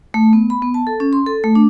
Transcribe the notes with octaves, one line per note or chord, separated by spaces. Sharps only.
A3
B3
B5
B3
A5
A4
C#4
C6
A4
A3
D4